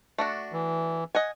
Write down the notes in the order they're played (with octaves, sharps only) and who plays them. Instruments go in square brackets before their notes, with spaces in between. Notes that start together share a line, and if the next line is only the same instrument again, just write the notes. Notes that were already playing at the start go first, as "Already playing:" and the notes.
[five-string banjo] A3 D4 F#4
[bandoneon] E3
[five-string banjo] D#5 F#5 G#5